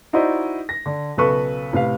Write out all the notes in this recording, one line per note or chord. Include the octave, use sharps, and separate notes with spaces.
D#4 E4 F#4 C5 D5 D#5
A#6
D3
B1 C#3 A4 B4 C#6
A2 C3 B4 F5